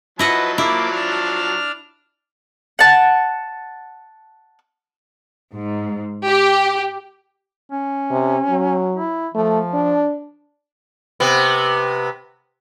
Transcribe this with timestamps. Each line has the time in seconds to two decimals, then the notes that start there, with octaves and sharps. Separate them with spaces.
0.19 F3 F#3 E4 B4 D#5 F#5 A5
0.58 A#3 E4 D6
0.92 D4 F6
2.79 F#5 A5
5.53 G#2
6.28 G4
7.72 C#4
8.11 C3
8.49 F#3
8.95 E4
9.34 F3 A3
9.74 D4
11.20 C3 B3